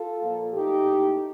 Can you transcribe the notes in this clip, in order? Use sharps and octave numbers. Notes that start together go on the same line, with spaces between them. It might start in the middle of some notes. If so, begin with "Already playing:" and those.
Already playing: F4 A4
A#2 F3 A#3
A#2 A3 D#4 G4
A2 A3